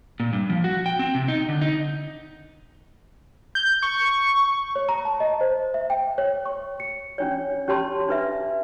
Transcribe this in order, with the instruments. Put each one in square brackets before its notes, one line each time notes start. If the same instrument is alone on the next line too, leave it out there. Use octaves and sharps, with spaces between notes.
[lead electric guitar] A#2
G2
F3
F#4
G5
C4
C3
D#4
D3
D#4
[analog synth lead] G6
C#6
[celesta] C#5
A#5
A5
D#5
C5
E5
G5
C#5
C#6
C#7
[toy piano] C#4 D4 C#5
C#4 G4 C#5 A5 C6
D4 B4 E5